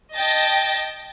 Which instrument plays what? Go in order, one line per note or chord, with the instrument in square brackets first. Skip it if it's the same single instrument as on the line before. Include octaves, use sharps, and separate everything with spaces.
[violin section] D#5 G5 A5 A6 A#6